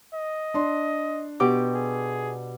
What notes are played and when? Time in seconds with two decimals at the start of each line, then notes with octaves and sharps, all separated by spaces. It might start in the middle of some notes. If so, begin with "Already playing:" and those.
0.14 D#5
0.54 D4 C6
1.40 B2 G4 D6
1.75 G#4